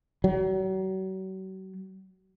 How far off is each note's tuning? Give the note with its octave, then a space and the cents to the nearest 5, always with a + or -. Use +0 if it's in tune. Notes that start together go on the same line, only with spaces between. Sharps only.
F#3 +40